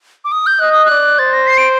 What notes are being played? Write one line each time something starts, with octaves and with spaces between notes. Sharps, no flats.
D6
D#6
G6
D#5 F#6
D#6
D5 F#6
C5 A6
A#6
C7
D7